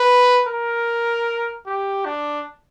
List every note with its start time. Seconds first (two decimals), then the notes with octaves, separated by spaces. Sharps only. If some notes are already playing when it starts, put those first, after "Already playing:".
Already playing: B4
0.49 A#4
1.67 G4
2.05 D4